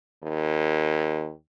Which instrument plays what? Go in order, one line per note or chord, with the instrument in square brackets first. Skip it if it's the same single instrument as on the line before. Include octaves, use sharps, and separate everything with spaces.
[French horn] D#2